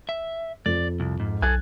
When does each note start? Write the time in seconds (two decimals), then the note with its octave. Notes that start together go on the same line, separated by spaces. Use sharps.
0.09 E5
0.66 F2 D5
1.00 C2
1.20 G#2
1.42 B1 A4 G#5 F#6 G#6